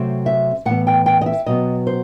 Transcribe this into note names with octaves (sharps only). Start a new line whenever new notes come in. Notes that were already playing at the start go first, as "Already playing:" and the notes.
Already playing: C3 F#3 A3 C4
E5
A2 E3 B3 F#5
G5
G5
D#5
E5
B2 F#3 B3 D#5
C5